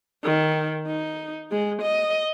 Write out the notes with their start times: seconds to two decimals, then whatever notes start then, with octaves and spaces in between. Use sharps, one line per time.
0.24 D#3
0.87 D#4
1.51 G#3
1.82 D#5